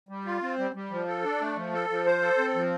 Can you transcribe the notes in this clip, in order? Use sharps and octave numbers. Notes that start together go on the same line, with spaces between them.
G3
F4
C4
G3
G3
F3
A4
D4
A3
F3
A4
F3
C5
A4
C4
F3